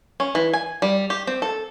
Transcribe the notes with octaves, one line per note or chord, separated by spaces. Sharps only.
C#4
E3
G#5
G3
G4
C4
A4